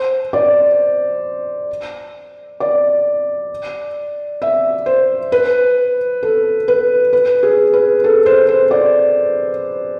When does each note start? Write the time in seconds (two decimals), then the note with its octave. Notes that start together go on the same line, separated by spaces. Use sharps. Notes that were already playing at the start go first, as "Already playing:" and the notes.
Already playing: C5
0.33 D5
2.60 D5
4.42 E5
4.86 C5
5.32 B4
6.23 A4
6.68 B4
7.13 B4
7.43 G#4
7.73 B4
8.04 A4
8.26 C5
8.48 C5
8.71 D5